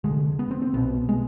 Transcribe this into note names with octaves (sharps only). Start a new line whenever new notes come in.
F1 D#2 D3 G#3
B3
C4
C4
B1 B2 B3
G#3